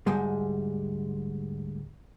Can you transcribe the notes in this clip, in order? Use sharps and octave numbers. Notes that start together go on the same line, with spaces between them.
D2 G#2 G3 G#3